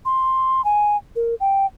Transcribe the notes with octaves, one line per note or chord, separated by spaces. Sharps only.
C6
G#5
A#4
G5